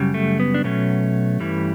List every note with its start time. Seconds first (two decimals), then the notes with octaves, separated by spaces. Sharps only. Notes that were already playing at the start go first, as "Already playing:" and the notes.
Already playing: F#2 C#3 G3
0.14 A3
0.40 B3
0.54 D4
0.64 B2 F#3 A3 C#4
1.40 G2 E3 G3